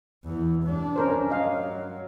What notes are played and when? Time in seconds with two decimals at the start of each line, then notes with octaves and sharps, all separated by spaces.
0.25 E2 E3
0.62 G2 D4
0.96 C#4 A#4 C5
1.30 F#3 D#5 F5